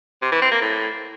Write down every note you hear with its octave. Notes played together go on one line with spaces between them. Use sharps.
C3
E3
C4
A#3
A2